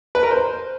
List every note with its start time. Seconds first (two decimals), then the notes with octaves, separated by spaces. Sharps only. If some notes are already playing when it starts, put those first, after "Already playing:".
0.15 B4
0.23 A#4
0.31 C5